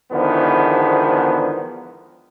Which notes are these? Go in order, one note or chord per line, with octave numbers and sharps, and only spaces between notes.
E2 G#2 D3 D#3 F3 B3